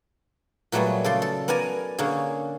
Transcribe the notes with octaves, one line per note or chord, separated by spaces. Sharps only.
A#2 F#3 G3 A3 B3 G#4
C#3 A4 D5 C6
A4
B3 A#4 D5 G#5 A#5
D3 A#3 C#4 G#4